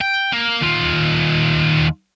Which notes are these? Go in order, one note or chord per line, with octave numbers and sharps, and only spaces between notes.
G5
A#3
D#2 F4